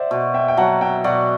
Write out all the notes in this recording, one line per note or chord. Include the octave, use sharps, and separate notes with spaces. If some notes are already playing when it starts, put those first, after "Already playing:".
Already playing: C5 D5 E5 F#5
B2
E5 G5
G5
F#3 F#5 A5
E5 G5
B2 D5 F#5